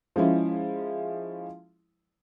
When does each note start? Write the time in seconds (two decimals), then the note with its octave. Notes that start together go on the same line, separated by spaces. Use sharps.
0.16 F3 G#3 C#4 E4